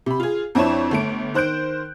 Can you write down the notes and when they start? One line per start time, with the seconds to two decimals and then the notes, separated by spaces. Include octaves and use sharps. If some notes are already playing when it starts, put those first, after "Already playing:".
0.06 C3 B5
0.20 F4 G#4
0.55 F2 C4 D4 E4 C#5 E7
0.91 G1 A3 D7
1.34 D#3 C5 F#6 G6 D7